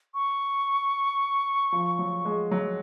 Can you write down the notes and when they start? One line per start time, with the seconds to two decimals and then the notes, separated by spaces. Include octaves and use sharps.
0.14 C#6
1.72 F3
1.99 F#3
2.25 G#3
2.51 F#3